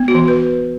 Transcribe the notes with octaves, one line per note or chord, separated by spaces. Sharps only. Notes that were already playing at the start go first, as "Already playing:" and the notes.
Already playing: B3
F#4
E3
B4